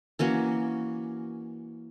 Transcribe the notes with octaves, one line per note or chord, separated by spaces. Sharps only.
E3 A#3 C#4 F#4